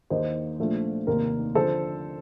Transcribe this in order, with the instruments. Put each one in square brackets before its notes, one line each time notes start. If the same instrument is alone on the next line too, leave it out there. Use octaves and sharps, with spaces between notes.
[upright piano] D#2 D#3 A#3 D#4 C5 D#5
A#2 F3 A3 D4 F4
F1 D#2 D#3 A#3 A#4
D3 F3 A4 C5